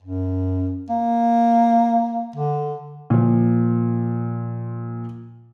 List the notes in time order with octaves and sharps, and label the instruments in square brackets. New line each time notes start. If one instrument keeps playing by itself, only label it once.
[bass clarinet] F#2
A#3
D3
[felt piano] A#2 F3